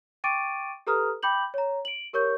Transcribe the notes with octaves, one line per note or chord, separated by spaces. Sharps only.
G5 C#6 D6 A6 D7 D#7
G4 A4 B4 A#5 D#6 F6
G5 B5 D6 G6 F#7
C#5 A#5
D7 F#7
G4 A#4 C#5 C#6 G6